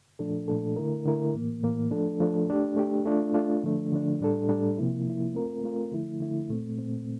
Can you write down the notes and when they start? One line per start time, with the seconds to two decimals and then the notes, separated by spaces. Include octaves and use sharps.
0.19 A#2 F3 A3 D4 A4
0.48 A#2 F3 A3 D4 A4
0.76 D3 A3 E4 A#4
1.06 D3 A3 E4 A#4
1.34 A2 E3 A#3
1.63 A2 E3 A#3
1.91 F3 A3 D4 A4
2.20 F3 A3 D4 A4
2.49 A3 D4 G4
2.76 A3 D4 G4
3.06 A3 D4 F4
3.34 A3 D4 F4
3.63 D3 F3 A3 D4
3.92 D3 F3 A3 D4
4.20 A2 G3 D4 A4
4.48 A2 G3 D4 A4
4.78 C3 F3 A#3 E4
5.06 C3 F3 A#3 E4
5.34 A3 C4 F4 A#4
5.64 A3 C4 F4 A#4
5.91 D3 F3 A3 E4
6.20 D3 F3 A3 E4
6.49 A#2 A3 C4
6.78 A#2 A3 C4